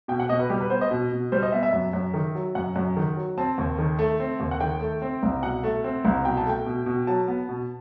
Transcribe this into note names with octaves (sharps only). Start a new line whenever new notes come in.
B2 G5
F#5
B2 D#5
B4
G3 G4
B4
B3 C5
D#5
B2
B2
G3 C5
D#5
B3 E5
E5
F#2
F#2
D#3
F#3
F#2 F#5
F#2
D#3
F#3
C4 A5
D#2
D#3
A3
C4
D#2
F#5
D#3 G5
A3
C4
C2
B2 F#5
A3
C4
C2
B2 G5
A5
A3 G5
B2
B2
F#3 A5
B3
B2